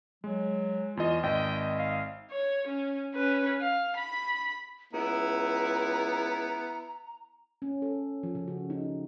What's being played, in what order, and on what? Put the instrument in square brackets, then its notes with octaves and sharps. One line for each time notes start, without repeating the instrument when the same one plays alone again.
[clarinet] F#3 [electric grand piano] G#3
[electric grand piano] E2 D#5 [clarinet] F4
[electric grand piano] G#1 D#5 [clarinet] G5
[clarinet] F5
[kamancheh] C#5
C#4
C#4 B4
F5
B5
[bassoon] C#2 [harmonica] B3 E4 [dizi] A#5
[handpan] C#4
A4
F3
C#3
F#4
D#4